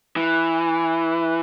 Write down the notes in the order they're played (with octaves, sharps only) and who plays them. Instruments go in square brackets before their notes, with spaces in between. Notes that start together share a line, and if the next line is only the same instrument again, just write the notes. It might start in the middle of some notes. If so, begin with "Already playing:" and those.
[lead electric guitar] E3